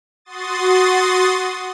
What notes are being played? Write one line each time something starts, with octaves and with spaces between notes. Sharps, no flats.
F#4 C6 D#6 A6